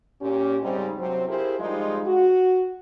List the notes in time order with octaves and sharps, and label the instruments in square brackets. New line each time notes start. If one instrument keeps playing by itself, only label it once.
[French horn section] A#2 C#4 G4
G#2 C#3 G3 G#3 C4 D#4
G2 C3 F#3 C4
E4 F4 G4 G#4 A#4 C5
F3 G3 G#3 D#4 F4
F#4